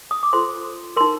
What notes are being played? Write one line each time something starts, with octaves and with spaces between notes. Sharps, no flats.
D#6
D6
F4 A4 C5 C6
D#4 A#4 C6